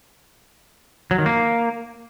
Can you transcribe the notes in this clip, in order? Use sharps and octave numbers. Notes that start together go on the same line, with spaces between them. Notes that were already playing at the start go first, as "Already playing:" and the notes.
F#3
D#3
A#3